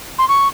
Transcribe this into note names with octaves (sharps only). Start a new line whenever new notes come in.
C6
C#6